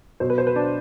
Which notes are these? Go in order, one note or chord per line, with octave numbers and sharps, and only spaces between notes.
B2 F#3 C5
B4
C5
B4
D4